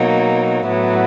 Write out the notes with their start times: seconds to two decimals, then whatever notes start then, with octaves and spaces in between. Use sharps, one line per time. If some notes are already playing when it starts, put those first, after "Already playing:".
Already playing: B2 F#3 A#3 D#4
0.68 A2 F#3 B3 E4